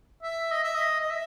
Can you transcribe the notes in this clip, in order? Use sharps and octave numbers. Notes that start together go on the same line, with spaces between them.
E5
D#5
E5
D#5
D#5
E5